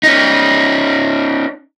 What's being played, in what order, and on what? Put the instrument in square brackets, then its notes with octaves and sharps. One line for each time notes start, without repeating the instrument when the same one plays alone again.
[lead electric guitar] C#4 D#4